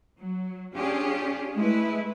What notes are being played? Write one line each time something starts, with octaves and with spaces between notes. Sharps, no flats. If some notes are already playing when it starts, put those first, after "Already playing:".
F#3
C#4 D4 F4 G4 G#4
G#3 A3 E4 B4